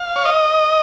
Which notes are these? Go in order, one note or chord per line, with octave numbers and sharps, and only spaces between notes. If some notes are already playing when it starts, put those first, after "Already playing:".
Already playing: F5
C#5
D#5